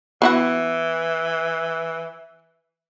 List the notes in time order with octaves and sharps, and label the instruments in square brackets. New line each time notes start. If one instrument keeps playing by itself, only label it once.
[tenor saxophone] E3 [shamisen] B3 E4 F#4